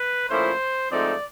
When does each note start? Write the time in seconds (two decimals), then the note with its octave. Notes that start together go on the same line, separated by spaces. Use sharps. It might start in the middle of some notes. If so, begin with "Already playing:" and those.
Already playing: B4
0.28 A#2 F3 A3 C#4 E4 C5
0.91 G#2 F3 A3 C4 D#4 D5